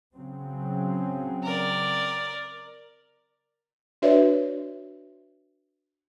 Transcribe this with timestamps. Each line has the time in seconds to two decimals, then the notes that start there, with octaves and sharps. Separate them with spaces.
0.14 C#3 F#3 C4
1.43 A#4 D5
4.02 D4 F#4 B4 C#5 D5 E5